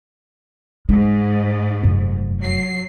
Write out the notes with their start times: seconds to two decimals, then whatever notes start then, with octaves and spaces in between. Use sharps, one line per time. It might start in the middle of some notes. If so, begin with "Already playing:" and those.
0.89 G#2 G#3
1.83 F1 F#2
2.41 F#3 C7